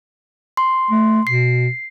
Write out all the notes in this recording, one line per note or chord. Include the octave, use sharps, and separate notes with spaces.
C6
A3
B2 C7